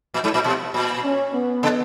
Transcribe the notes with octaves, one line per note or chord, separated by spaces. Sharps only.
A#2
G#2
A#2
B2
A#2
C#4
B3
C#3